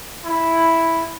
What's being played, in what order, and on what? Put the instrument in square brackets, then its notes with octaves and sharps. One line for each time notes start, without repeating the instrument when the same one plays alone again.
[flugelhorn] E4